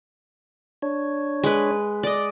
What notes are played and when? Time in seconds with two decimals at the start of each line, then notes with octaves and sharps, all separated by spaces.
0.82 D4 C#5
1.43 G#3 B4
2.03 D5 D#5